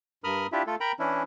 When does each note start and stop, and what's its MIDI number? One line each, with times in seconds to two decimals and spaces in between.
0.24 0.47 43
0.24 0.47 70
0.24 0.47 83
0.24 0.47 87
0.24 0.47 89
0.52 0.63 62
0.52 0.63 64
0.52 0.63 65
0.52 0.63 67
0.52 0.63 76
0.67 0.75 57
0.67 0.75 65
0.67 0.75 69
0.80 0.92 70
0.80 0.92 79
0.80 0.92 82
0.80 0.92 83
0.99 1.23 52
0.99 1.23 61
0.99 1.23 62
0.99 1.23 64